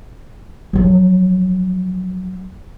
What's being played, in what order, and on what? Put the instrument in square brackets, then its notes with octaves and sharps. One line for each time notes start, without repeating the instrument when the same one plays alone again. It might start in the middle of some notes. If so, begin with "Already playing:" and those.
[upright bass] F3 F#3